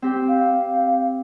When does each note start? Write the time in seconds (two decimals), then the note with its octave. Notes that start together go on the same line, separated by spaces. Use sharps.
0.02 C4 G4
0.28 F5